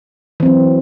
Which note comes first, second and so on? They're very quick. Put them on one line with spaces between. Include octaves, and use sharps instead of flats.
E3 C4 F#3